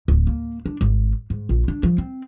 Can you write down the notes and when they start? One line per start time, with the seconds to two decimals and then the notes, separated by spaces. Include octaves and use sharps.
0.08 D1
0.27 A#3
0.66 D4
0.81 G#1
1.30 G#2
1.49 A#1
1.68 D4
1.83 F3
1.98 C4